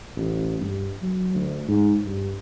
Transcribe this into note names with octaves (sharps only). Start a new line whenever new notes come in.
A1
G2
F#3
D2
G#2
G2